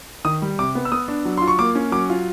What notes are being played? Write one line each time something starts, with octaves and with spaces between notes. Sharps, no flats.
D#3 D#6
G3
C3 D6
B3
E6
B3 D#6
D4
F#3
F4 C6
C#6
A#3 D6
C#4
F#3 D6
F4